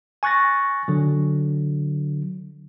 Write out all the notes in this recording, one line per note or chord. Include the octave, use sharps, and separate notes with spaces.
G#5 C#6 F#6 A6 A#6
D3 F#3